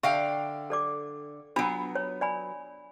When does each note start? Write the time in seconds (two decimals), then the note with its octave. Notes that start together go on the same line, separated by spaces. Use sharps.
0.03 D3 E5 F5 G5 C#6
0.70 A4 D5 D6
1.56 F#3 B3 D4 F4 B5
1.95 C#5
2.21 D5 G#5 B5